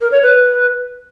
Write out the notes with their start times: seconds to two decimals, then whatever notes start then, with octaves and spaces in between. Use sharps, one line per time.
0.01 A#4
0.12 C#5
0.23 B4